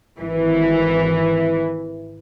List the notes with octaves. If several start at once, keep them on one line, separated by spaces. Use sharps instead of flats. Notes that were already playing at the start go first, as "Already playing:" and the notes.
G#1 E3